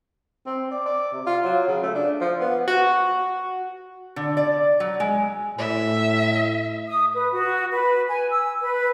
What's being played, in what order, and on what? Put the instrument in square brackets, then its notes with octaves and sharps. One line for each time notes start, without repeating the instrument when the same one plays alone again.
[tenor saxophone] C4
D5
D5
C3
F4
F#3
C#3
A3
D4
F3
B3
[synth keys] F#4
[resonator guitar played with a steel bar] D3
D5
F#3
G#3
[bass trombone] A2 [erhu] E5
[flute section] D#6
B4
F#4
B4
G#5
E6
B4